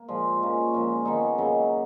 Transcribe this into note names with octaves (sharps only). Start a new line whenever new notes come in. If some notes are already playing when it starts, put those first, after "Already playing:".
Already playing: A#3
A#2 F3 G#3
F3 A#3 C#4
A#2 F3 G#3
D#3 G#3 B3 D#4
C#3 F#3 A#3